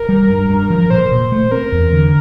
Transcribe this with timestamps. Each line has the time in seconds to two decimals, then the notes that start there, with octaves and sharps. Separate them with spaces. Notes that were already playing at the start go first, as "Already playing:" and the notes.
Already playing: A#4
0.09 G3
0.29 G2
0.50 G2
0.70 F3
0.90 A#2 C5
1.11 A#2
1.32 A3
1.51 C4 A#4
1.72 E2
1.92 D3